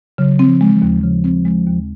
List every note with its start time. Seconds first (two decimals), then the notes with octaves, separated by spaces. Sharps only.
0.18 C#3 F#3
0.39 C4
0.47 F3
0.61 G#3
0.75 F3
0.82 D#2
1.03 C#3 F3
1.24 C4
1.45 G#3
1.66 D#2